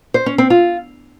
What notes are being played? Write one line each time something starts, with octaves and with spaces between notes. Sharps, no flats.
C5
C#4
C4
F4